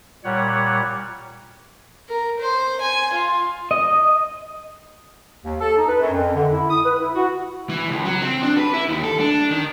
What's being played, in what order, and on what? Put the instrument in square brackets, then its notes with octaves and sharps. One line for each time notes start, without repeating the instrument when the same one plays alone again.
[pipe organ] A#2 G3 C#5 F#5
[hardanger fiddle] A#4
C5
G#5
F4
[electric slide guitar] D#5
[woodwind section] D#2
A4
D#4
B4
F#2
F2
D3
E4
D#6
B4
E4
F#4
[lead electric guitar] E3
C#2
F#3
C4
D4
B4
E4
D#2
A4
D4
D#3